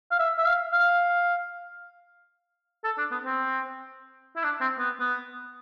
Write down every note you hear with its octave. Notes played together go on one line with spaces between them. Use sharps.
F5
E5
E5
F5
F5
A4
D4
B3
C4
E4
D4
C4
B3
B3